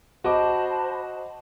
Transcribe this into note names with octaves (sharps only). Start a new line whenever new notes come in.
F#4 C5 D#5 A5 B5 D6